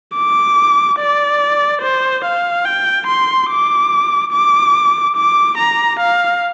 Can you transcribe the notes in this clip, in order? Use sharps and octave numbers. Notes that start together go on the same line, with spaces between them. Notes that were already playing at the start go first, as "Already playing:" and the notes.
D6
D5
C5
F5
G5
C6
D6
D6
D6
A#5
F5